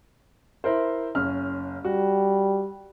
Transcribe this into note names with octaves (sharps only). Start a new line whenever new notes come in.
E4 A#4 C5
F#1 C#4 F6
G3 F#4